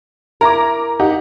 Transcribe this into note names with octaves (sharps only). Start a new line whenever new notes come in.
E4 A#4 A#5 D6
D#4 G4 F#5